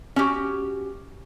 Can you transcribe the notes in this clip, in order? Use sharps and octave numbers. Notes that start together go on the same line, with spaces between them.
C#4 F#4 G4